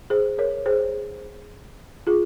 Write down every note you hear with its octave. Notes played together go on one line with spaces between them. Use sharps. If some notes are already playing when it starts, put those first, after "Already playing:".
G#4 C5
A#4 C#5
G#4 C5
F4 G#4